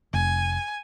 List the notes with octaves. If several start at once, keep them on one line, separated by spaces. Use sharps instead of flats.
F1 G#5